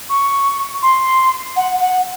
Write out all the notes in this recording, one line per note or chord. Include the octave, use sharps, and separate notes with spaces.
C#6
C6
F#5
F#5